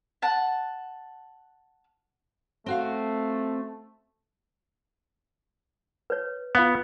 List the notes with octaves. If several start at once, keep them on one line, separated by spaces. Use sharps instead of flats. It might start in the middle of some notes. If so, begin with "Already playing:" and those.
F#5 A5
A3 C4 F#4 F5
B4 C#5
B3 F4 F5 F#5